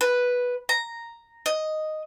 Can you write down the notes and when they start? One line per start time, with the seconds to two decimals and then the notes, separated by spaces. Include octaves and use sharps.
0.01 B4
0.69 A#5
1.46 D#5